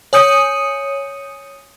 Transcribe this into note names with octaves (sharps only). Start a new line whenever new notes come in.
C#5 G#5 D#6 G6 C#7 D#7